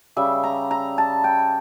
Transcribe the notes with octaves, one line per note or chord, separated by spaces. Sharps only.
C#3 G3 E5
A#5
A#5
A5
G5